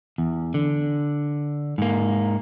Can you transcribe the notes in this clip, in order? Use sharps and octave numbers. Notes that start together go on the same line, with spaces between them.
E2
D3
G#2 A#3